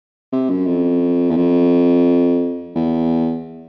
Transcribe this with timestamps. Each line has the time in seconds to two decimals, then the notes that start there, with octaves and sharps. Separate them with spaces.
0.32 C3
0.50 F#2
0.66 F2
1.30 E2
1.36 F2
2.75 E2